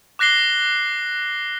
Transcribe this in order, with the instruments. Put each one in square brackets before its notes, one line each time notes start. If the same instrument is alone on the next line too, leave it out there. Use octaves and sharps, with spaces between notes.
[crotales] D6 F#6 A#6 C7 G7